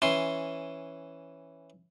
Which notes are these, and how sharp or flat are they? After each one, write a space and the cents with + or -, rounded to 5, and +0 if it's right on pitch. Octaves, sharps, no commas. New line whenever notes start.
E3 +0 C#4 -5 C6 +0